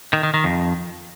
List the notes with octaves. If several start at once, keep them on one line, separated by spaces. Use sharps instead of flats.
D#3
D#3
D#3
F2